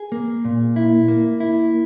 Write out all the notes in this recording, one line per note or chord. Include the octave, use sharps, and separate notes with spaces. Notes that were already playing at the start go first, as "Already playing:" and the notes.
Already playing: G#4
A#3
A#2
E4
A#3
E4